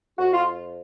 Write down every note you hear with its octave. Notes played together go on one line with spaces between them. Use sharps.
F2 F#4
F4